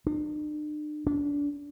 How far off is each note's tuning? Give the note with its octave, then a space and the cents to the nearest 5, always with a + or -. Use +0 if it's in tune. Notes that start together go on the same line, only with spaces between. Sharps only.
D4 +45
D4 -30